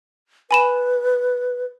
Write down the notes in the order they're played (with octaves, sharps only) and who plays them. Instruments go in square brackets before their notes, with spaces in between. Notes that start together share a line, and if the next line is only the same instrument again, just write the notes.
[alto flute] B4 [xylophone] G#5 B5 E7